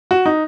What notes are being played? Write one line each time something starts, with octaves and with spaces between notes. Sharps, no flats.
F#4
D#4